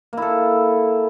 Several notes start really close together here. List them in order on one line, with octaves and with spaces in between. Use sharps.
A#3 E4 A4